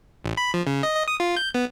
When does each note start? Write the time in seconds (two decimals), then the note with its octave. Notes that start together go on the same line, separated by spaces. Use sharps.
0.24 A1
0.37 B5
0.54 F3
0.67 C#3
0.83 D#5
0.95 D#5
1.08 D#6
1.20 F4
1.37 G6
1.54 B3